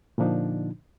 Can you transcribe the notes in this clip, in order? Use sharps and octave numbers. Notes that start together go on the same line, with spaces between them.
A#2 D3 F3 D4 D#4